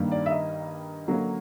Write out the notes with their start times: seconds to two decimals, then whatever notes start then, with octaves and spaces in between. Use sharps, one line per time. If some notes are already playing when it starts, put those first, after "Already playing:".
Already playing: G2 D#3 G3 A#3
0.12 D5
0.26 E5
0.31 D#5
1.08 D3 F#3 A#3 C#4